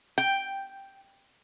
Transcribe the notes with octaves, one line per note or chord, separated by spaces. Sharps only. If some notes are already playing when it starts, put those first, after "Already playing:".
G5